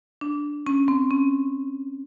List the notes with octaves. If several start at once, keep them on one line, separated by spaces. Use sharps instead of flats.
D4
C#4
C4
C#4